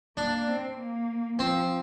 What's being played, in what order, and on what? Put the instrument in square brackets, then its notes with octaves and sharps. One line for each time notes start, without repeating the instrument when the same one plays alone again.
[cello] A#3 [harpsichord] D4
[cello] C4
A#3
[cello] F3 [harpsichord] C4